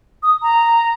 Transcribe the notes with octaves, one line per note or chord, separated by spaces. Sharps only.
D#6
A#5